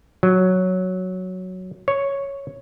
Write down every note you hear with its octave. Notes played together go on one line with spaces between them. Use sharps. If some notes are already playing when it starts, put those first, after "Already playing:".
F#3
C#5